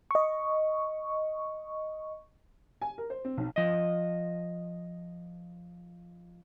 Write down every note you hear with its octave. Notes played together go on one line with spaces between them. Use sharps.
D#5 C#6
G#5
A#4
C5
C4
B1
F3 D#5